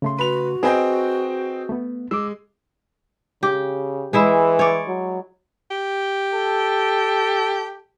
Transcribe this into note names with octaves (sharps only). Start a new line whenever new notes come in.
C#3 A3 C6
F#4 B4 F7
C4 G#4 B4 D#5 G5 G#5
A3 B3
G#3 D6 E6
C#3 G4
E3 G#3 E4 E5
C#5 D5
F#3
G4
A4